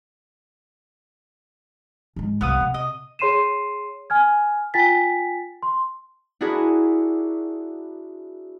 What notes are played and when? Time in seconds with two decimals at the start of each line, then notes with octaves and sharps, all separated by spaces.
2.16 G#1 G#3
2.41 C2 B3 F5 D#6
2.60 C3
2.74 D#5
3.19 G#4 C#5 C6 C7 D#7 E7
4.10 G#5 F6 G#6
4.74 F4 G5 G#5 A6 B6
5.63 C6
6.41 D4 E4 F#4 G#4 A#4